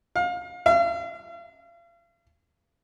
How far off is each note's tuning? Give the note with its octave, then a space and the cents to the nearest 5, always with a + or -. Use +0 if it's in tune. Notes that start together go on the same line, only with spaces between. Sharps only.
F5 +30
F5 -40